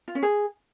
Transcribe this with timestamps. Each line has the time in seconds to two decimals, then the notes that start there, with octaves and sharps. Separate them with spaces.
0.08 F4
0.15 C#4
0.23 G#4